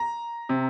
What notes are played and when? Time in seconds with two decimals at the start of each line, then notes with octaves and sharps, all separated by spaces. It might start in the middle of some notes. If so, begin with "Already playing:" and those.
Already playing: A#5
0.49 C3